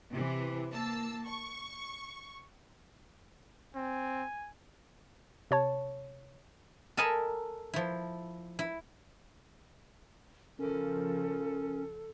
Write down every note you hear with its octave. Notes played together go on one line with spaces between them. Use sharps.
C3 E3
A#3 A5 E6
C#6
C4 G#5
C3 C#5 A5
A4 A#4 D#5 G#5 A5 B5
F3 E4
E4
C#3 F3 C#4 A4 A#4